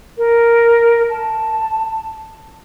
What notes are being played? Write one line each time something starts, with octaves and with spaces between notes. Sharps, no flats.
A#4
A5